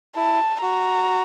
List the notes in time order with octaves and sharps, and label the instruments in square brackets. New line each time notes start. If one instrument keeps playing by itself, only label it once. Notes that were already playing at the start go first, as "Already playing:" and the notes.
[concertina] E4 [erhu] A5
[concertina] F#4 [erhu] A#5